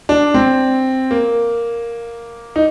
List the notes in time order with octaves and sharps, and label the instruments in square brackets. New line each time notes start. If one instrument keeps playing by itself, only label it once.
[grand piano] D4
C4
A#3
D#4